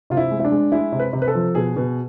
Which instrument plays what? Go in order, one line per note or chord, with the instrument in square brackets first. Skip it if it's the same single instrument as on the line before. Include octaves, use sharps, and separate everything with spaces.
[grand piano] C3 F4
E4
G#3
E4
D4
G#3
G#3 E4
C3
B4
C3
B4
A4
F3
B2 G#4
B2